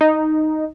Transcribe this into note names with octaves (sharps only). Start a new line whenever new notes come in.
D#4